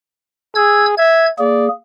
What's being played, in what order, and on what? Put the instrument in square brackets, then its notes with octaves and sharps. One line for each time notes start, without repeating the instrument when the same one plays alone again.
[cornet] G#4 [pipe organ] E6 G#6
[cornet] E5 [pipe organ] G#6
[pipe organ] A#3 G#4 [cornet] D5